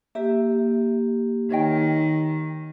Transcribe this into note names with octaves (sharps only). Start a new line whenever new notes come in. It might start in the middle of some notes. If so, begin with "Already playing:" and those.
A#3 G4 E5
D#3 C#5 D#5 G5